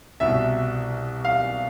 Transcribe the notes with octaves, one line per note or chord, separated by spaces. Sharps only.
C2 B2 E5
F5